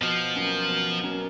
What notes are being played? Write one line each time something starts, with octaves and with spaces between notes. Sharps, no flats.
B2 F3
F#3 A#3 C#4
B2
F#3 A#3 C#4